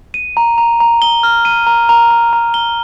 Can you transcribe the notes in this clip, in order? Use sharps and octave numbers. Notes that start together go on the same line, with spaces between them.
D#7
A#5
A#5
A#5
G7
F6
D#7
A#5
A#5
A#5
A#5
G7